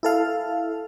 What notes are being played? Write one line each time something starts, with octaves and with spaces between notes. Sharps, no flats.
E4 A4 F5